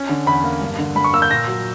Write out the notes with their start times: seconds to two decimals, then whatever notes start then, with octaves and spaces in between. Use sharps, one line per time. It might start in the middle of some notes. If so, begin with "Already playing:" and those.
Already playing: C#4
0.09 D3
0.26 E2 B5
0.44 A#3
0.61 G2
0.79 D3
0.95 G2 B5
1.04 C#6
1.13 A#3 E6
1.22 G6
1.31 A#2 A#6
1.48 F#3